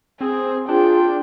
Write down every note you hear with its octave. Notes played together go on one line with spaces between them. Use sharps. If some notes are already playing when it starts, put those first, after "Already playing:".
C4 G#4
D4 F4 G#4 G5